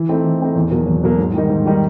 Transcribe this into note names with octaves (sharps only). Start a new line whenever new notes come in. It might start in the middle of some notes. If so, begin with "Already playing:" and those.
Already playing: E3
A3 C4 D#4
E3
A3 C4 D#4
E2
B2 F#3 A#3
E2
B2 F#3 A#3
G#2
D#3 G3 A#3 D#4
G#2
D#3 G3 A#3 D#4